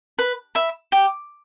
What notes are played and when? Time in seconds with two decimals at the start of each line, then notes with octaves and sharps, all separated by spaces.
0.19 B4
0.55 E5 B5
0.92 G4